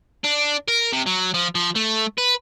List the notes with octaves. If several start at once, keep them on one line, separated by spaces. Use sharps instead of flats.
D4
A#4
C3
F#3
F3
F3
A3
B4